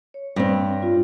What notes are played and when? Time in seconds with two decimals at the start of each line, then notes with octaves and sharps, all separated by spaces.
0.14 C#5
0.36 G2 C4
0.82 F4